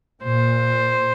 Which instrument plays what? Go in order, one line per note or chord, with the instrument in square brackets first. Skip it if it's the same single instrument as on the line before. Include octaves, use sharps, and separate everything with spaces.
[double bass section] A#2 [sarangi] C5